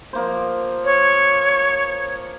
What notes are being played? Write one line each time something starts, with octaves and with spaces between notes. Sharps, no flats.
F3 A#3 C5
C#5